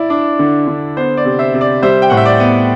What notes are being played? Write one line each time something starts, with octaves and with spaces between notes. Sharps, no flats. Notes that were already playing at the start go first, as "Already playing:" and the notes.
Already playing: E4 D5
D4
D3
D3
B3 C5
D5
C3
C5 E5
C3
D5
G3 C5 E5
G5
A2 F#5
E5
D5
B3